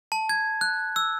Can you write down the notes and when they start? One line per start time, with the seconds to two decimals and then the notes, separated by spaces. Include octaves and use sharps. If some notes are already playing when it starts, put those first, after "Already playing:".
0.12 A5
0.29 G#6
0.61 F#6
0.96 E6